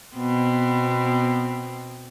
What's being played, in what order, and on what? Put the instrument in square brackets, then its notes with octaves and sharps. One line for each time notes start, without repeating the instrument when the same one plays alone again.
[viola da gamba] B2 B3 C4